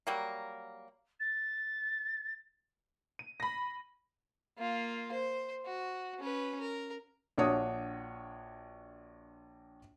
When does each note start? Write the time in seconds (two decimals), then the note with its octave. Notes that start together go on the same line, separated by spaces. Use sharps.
0.07 F#3 G3 A#3
1.20 A6
3.19 D#7
3.40 B5 A#6
4.58 A#3 F4
5.12 C5
5.66 F#4
6.20 C#4 B4
6.61 A#4
7.38 A#1 D4 F#4 C#5 F#5 D#6